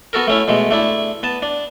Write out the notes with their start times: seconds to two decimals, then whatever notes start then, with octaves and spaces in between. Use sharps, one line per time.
0.13 B3 F#4 A4 A#4
0.27 A3 C#4 E4
0.48 B2 G#3 A3
0.71 A3 D4 E4
1.23 B3 A5
1.42 D4